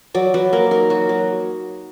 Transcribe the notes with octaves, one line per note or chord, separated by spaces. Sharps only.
F#3 D5
F#3 B4
A#3 A#4
D#4 A#4
F#3 F#4
F#3